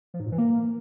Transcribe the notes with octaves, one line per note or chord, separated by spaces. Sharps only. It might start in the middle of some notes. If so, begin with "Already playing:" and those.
F3
G#2
A#2
E3
A#3